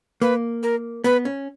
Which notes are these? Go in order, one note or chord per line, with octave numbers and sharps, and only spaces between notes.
A#3 B4
A#4
B3 B4
C#4